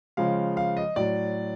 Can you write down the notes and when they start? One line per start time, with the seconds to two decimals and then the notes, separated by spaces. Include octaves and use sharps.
0.17 C#3 F3 G#3 F5
0.57 F5
0.77 D#5
0.96 A2 F#3 D5